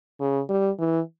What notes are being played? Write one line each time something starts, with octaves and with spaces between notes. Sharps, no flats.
C#3
G3
E3